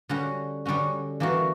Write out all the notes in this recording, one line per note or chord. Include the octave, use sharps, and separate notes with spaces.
D3 G3 C#4 F#4
D3 G3 C#4 F#4
E3 A#3 D4 F#4